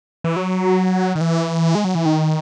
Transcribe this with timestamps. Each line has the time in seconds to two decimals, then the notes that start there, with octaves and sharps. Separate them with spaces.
0.24 E3
0.36 F#3
1.15 D#3
1.21 E3
1.75 G#3
1.84 F#3
1.95 E3
2.05 D#3